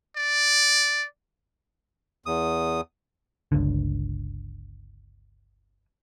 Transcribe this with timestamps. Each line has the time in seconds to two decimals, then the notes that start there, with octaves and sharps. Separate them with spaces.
0.17 D5
2.26 E2 D#6
3.52 G1 C#2 D3